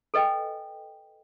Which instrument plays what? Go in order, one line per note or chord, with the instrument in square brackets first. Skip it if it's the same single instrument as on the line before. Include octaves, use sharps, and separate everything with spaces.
[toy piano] A4 B4 D#5 G5 G#5